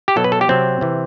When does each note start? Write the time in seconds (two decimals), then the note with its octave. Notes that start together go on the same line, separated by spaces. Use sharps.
0.08 G4
0.16 B2 F#3 A4
0.24 B4
0.32 A4
0.41 G4
0.49 C3 F#3 C4
0.81 C3 E3